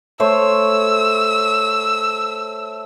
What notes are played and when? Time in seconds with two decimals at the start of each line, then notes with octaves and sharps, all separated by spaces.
0.20 A3 C5 C#5 E6